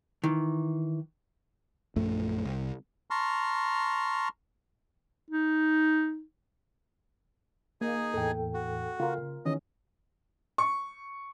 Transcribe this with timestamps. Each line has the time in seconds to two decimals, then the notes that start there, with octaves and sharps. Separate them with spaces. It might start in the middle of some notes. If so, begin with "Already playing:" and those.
0.24 D#3 E3
1.96 A#1 F#2 A3
2.45 C2
3.10 A5 A#5 C6 C#6 F6
5.30 D#4
7.81 A#3 D#4 G#4 G#5
8.14 E2 A2 E3 A4 G5
8.54 F#4
9.00 C#3 F4 A#4
9.45 D#3 E3 C#4 D#5
10.58 C#6